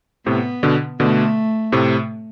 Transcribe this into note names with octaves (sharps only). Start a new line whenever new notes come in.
A2 C3 B3
B2 D3
B2 D3 A3
A2 C3